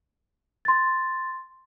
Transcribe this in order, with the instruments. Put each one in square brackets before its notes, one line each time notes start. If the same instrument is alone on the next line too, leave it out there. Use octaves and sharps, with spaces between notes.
[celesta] C6 A6